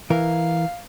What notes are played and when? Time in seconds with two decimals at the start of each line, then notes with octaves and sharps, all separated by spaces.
0.10 E3 A#4 F5